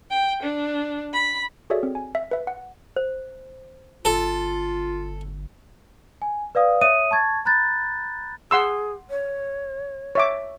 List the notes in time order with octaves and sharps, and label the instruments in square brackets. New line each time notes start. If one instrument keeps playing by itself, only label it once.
[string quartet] G5
D4
B5
[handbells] F#4 G#4 A4 C#5 D5 E5
C4
G#5
E5
B4 E5
F#5
[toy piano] C5
[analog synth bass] G1 [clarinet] F4 [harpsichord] A4
[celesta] G#5
B4 D5 F5 D#6
C#5 E5 D#6 D#7
A5 C#6 G#6 A6
A#5 B5 F#6 G6 A6
[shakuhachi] G#4 [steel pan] F#5 C6 E6
[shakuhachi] C#5
[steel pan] C#5 E5 D6